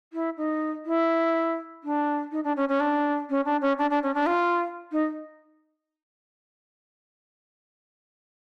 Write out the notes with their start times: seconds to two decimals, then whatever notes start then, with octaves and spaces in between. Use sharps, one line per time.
0.13 E4
0.37 D#4
0.86 E4
1.84 D4
2.32 D#4
2.44 D4
2.57 C#4
2.69 C#4
2.80 D4
3.30 C#4
3.45 D4
3.62 C#4
3.78 D4
3.90 D4
4.03 C#4
4.15 D4
4.26 F4
4.92 D#4